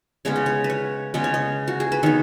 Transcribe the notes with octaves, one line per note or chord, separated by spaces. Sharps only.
C#3 G#3 B3 C#5
D#5
C#5
B4
C#5
C#3 G#3 B3 D#5
C#5
D#5
F#4
G#4
B4
D#3 B3 C#5